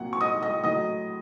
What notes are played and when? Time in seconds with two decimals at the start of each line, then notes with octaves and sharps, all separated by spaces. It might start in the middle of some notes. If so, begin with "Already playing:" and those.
Already playing: C2 A#2 F#3 F#5
0.13 C#6
0.21 D#5 D#6
0.43 D#5 D#6
0.64 A2 F#3 D#5 D#6